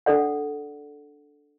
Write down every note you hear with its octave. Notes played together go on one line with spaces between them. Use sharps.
D4 A4 D5 F#5